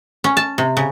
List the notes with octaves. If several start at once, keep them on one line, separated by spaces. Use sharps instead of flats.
C#4
A5
C3
C#3